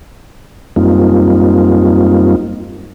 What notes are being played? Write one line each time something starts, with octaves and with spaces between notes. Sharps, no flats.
F#2 G3 A#3 C4 D#4 F4